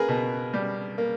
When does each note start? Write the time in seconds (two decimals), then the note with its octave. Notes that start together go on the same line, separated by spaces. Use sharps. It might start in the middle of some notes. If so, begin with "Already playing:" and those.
Already playing: A#3 G#4 A#4 B4
0.09 B2
0.54 G3
0.98 A#3